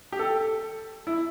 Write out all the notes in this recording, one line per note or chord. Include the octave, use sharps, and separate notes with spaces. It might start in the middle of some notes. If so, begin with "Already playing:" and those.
G4
A4
E4